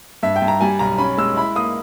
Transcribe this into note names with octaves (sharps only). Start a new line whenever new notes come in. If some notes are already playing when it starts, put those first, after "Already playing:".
G2 E5
G5
G2
A#5
G3 G#5
B1 A#5
C#4 B5
G#3 E6
E4 B5
A#3 D#6